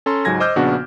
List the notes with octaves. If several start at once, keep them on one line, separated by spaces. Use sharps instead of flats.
C#4 A4 A#5 C6
C#2 G#2 F#3 G#5 G#6 A#6
C5 D#5 D6 E6 F6 G6
A#1 C#3 B3 D4 F#4 F#5